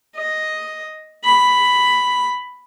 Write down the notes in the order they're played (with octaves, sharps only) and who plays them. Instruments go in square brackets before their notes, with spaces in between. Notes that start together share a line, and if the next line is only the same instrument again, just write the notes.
[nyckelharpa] D#5
B5